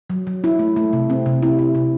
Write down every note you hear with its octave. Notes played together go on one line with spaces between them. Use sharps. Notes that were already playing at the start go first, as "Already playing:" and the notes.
F#3
F#3
E4
A3
A3
C3
C4
C3
E4
E4
C3